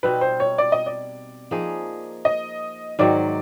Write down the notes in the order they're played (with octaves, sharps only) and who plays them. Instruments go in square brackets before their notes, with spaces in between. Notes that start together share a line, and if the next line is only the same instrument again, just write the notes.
[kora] B2 G3 C4 D#4 [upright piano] B4
[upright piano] C5
C#5
D5
D#5
D5
[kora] F3 A#3 D#4 G#4
[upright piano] D#5
[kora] G#2 D#3 F#3 [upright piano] D5